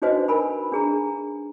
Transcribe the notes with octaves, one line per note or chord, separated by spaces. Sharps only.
D4 D#4 F#4 B4 C5 D#5
A#4 G#5 B5
D4 G#4 A#5